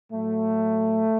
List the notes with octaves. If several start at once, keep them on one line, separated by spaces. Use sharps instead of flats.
A2 F#3 A3